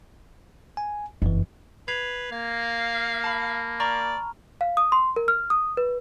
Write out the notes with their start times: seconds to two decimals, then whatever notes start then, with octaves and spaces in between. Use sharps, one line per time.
0.77 G#5
1.22 F#1 F2 E3
1.88 B4 G#6 C7 F7
2.32 A#3 F5
3.24 A5 B5
3.80 D5 A#5 C#6 F6
4.61 F5
4.77 D#6
4.92 C6
5.16 A#4
5.28 F6
5.50 D#6
5.77 B4